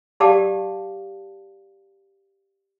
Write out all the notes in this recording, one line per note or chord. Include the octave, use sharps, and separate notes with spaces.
G4 D5 F5 G5 A5 D6